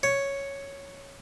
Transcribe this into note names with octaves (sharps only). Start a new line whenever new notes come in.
C#5